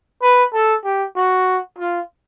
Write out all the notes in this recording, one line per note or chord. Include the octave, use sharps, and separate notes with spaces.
B4
A4
G4
F#4
F4